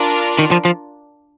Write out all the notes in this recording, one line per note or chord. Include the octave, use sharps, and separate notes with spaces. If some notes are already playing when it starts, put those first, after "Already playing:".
Already playing: D4 F4 A#4 D5
D#3
F3
F3